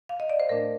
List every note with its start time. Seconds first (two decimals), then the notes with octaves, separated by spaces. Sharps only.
0.09 F5
0.20 D#5
0.30 D5
0.40 C5
0.49 A2 A3 D4 A#4